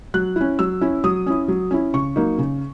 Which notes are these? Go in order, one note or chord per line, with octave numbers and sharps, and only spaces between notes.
F#3 F#6
C#4 E4
F#3 E6
C#4 E4
F#3 D#6
C#4 E4
F#3
C#4 E4
C#3 C#6
F#3 A#3 D#4
C#3